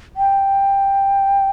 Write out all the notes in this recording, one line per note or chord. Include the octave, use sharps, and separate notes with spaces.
G5